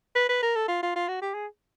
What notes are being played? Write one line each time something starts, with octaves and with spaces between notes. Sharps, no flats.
B4
B4
A#4
A4
F4
F4
F4
F#4
G4
G#4